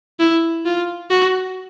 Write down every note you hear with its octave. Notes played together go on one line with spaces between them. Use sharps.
E4
F4
F#4